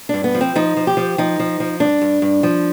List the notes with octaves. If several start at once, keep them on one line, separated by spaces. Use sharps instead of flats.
G2 D4
B3
F3
C4
F3 D#4
F3
G4
F3
F3 D#4
F3
F3
G2 D4
G2
G2
F3